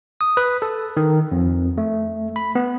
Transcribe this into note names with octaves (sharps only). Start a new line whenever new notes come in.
D#6
B4
A4
D#3
F2
A3
B5
B3